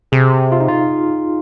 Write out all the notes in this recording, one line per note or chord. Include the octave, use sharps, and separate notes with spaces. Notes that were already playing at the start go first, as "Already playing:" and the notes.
C3 G#4
F4
D#4
F4